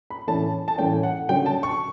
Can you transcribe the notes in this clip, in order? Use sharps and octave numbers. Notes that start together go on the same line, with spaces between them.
B5
A2 E3 A3 C#4 A5
A5
A2 E3 A3 C#4 G5
F#5
D3 F#3 C#4 G5
A5
C#6